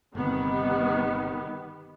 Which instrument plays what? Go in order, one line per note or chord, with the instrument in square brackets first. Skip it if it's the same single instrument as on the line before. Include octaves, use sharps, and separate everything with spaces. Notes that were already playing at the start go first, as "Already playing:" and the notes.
[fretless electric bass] G1 C3 [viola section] D#3 G3 B3